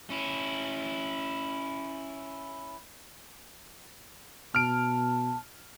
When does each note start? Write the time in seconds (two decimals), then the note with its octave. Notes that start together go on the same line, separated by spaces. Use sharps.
0.10 C#4 E4
4.55 B2 A5 F6 D7